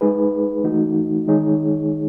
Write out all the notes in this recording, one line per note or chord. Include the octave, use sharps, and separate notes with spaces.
G#3 D#4 G#4 B4
E3 A3 D#4 F#4
D#3 G#3 D#4 G#4 C#5